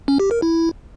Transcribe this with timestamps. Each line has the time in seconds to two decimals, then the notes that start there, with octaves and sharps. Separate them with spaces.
0.08 C#4
0.20 G4
0.31 A#4
0.42 E4